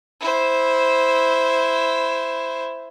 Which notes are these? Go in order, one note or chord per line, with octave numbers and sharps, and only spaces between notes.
E4 C5